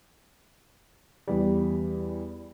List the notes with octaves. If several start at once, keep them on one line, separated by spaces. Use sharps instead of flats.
E2 G3